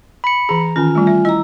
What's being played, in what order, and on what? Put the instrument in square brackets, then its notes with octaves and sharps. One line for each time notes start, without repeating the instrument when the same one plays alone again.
[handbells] B5 C#7
[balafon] E3 G#4 [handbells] A#5
[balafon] D#3 C#4 [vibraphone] F4 G#5
[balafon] G3 A3
E5
[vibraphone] E4 A#5 [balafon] D#5